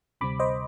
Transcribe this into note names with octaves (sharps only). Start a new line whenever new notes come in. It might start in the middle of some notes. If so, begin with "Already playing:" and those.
D2 C3 G3 C4 B5 D6
C5 D#5